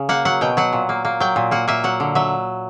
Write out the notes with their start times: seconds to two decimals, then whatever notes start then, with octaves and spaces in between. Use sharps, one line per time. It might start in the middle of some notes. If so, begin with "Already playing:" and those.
Already playing: C#3
0.09 A#3 F#5
0.25 F#3 F#5
0.41 B2 G5
0.57 F#3 F#5
0.73 A#2
0.89 A#3
1.05 A#3
1.20 F#3 G5
1.36 A#2
1.51 A#3 F#5
1.68 A#3 E5
1.84 F#3 F#5
2.00 D3
2.15 F#3 E5